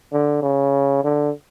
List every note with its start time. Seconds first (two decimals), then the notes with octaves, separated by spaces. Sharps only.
0.12 D3
0.42 C#3
1.04 D3